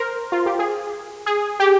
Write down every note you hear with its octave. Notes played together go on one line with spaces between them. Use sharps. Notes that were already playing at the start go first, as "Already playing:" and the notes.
Already playing: A#4 C5
F4
G4
G#4
G#4
G4